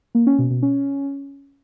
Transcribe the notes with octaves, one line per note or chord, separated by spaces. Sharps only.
A#3
C#4
B2
B2
C#4